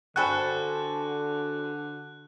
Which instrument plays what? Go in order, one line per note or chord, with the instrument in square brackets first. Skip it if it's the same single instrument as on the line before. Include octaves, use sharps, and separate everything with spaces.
[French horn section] D3 [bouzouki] F#4 A4 C5 [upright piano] G5 G#5 B5 [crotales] F#6